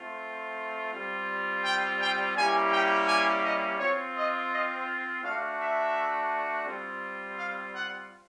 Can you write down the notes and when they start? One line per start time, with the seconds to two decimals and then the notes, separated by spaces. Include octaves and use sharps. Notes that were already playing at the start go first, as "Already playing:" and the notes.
Already playing: A3 C4 F4
0.92 G3 C4 F4
1.64 G5
2.00 G5
2.35 G3 A#3 C#4 E4 G4 G#5
2.72 G5
3.07 G#5
3.43 D#5
3.79 C4 F4 C#5
4.16 D#5
4.52 D#5
5.23 A3 D4 F#4 F5
5.59 E5
6.66 G3 C4 F4
7.38 F5
7.74 F#5